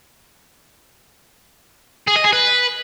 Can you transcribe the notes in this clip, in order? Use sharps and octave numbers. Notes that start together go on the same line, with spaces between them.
G#4
D#5
G#4
B4